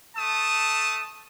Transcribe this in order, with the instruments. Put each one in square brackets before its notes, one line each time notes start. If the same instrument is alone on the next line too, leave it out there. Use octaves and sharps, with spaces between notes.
[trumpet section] A3 A5 D#6